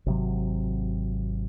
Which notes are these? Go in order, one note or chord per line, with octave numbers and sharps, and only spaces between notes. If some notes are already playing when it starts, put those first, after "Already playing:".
G#1 C3 F#3